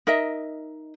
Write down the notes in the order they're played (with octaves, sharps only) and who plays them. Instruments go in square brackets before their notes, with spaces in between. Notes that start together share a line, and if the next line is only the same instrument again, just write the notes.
[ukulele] D#4 A#4 D#5 E5